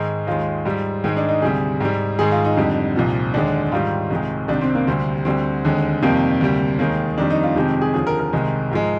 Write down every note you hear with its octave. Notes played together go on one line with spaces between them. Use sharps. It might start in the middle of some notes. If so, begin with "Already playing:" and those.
Already playing: G#2 D#3 G#3
D#2 D#3 G#3 F4
G#2 G3
G#2 D#3 G#3 D#4
D4
D#4
D2 C3 G3 G#4
G#2 G3
G#2 D#3 G#3 G#4
F4
D#4
F2 D3 G3
C2 A#2 F3
D#2 D3 G#3 D4
G#2 D#3 G3 F4
C2 C3 D#3 G#3
C2 C3 D#3 D4
C4
A#3
D2 C3 G3 C4
D2 D3 G3 C4
D#2 D3 G#3
F2 C3 D#3 G3 A#3
D2 C3 G3
D#2 D#3 G#3 A#3
F2 D#3 G3 D4
D#4
F4
F2 C3 D#3 G#3 G4
G#4
D#2 D3 F3 G#4
A#4
A#4
C2 C3 D#3 G#3
G#2 F3 G#3